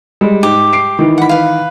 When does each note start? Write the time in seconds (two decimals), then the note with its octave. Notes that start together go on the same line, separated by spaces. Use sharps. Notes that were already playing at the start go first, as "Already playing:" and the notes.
0.21 G3 G#3
0.43 G#2 G4
0.73 C7 D7
0.99 D#3 E3
1.18 F#5 B5
1.29 B4 F5